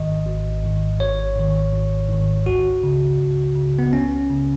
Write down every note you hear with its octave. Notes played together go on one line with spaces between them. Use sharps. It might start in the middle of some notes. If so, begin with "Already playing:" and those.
Already playing: G#1 G#2 D#3 D#5
G#1
G#2 D#3
G#1 C#5
G#2 D#3
G#1
G#2 D#3
C#2 F#4
C#3
C#2
C#3
B3
C#2 C#4
C#3